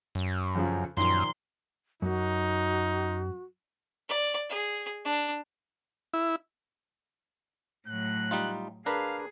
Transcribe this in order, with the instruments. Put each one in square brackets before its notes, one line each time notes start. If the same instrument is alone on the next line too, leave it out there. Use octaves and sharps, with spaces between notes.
[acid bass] F#2
[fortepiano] F2 C#3 F3
[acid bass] F#2 [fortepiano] A#2 D#3 F3 [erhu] C6
[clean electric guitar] F#2 [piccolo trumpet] D#4 [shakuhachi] F#4
[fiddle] D5
G#4
D4
[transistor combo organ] E4
[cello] A2 F#3 [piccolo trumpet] F#6
[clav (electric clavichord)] G3 D#4 F4
[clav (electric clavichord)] D4 A#4 B4 [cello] G#4 [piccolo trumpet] F5